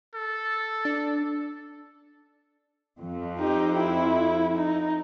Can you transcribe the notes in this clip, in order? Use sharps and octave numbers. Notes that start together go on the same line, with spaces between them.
A4
D4
F2
D#4 G4
E4
D#4